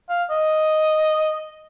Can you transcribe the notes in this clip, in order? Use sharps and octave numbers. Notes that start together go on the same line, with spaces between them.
F5
D#5